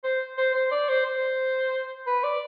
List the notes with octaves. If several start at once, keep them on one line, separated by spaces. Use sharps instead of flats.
C5
C5
C5
D5
C5
C5
B4
D5